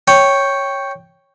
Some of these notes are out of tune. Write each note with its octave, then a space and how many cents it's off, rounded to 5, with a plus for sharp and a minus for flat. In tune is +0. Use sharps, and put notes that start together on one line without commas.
C#5 +0 G5 +0